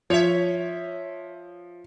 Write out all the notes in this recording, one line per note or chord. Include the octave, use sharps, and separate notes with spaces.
F3 C#5 E5